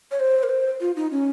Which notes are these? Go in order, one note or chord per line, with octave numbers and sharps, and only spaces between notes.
C#5
C5
A#4
C5
F4
D#4
C#4